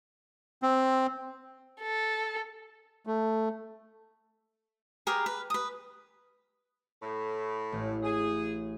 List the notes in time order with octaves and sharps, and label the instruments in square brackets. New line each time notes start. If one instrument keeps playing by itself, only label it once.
[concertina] C4
[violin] A4
[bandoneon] A3
[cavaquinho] G4 G#4 A#4 B4
B4
B4 D#6
[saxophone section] A2
[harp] A1
[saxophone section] G#4